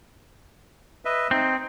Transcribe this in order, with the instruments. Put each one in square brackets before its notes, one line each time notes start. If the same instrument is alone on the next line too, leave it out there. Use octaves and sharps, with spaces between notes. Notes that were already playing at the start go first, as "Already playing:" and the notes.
[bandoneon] B4 D#5 E5
[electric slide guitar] C4 [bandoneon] D#4